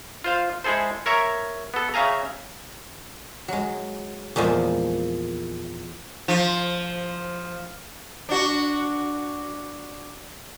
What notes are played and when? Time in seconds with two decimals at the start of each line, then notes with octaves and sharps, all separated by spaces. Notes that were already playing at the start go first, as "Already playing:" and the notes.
0.24 F4 C5 F5
0.64 G#3 E4 G#4 A4 C5
1.06 A#4 C#5 E5 A#5
1.74 B3 A4
1.94 C#3 E5 F5 G#5 A#5
3.48 F#3 G#3
4.36 E2 A#2 F3 G#3
6.28 F3
8.29 D4 F#4